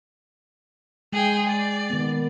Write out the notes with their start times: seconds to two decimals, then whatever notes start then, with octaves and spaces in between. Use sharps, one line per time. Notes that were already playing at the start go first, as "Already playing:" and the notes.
1.13 G#3 G#4 G5
1.48 D5
1.90 D#3 B3